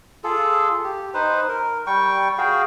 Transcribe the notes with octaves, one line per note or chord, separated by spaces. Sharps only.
F4 G#4 A4
G4
D#4 B4 C5
A#4
G3 G5 C#6
F#4 G#4 F5 G5